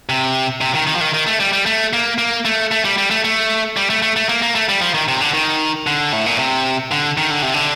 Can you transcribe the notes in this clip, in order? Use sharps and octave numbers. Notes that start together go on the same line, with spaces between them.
C3
C3
D#3
D#3
F3
D#3
D#3
A3
G3
G3
A3
A#3
A#3
A3
A3
G3
G3
A3
A3
G3
A3
A3
A3
A#3
A#3
A3
G3
F3
D#3
C3
D3
D#3
D3
A2
A#2
C3
D3
D#3
D3
C3
D3